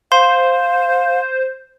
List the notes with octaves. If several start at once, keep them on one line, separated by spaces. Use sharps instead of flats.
C5 F5 C6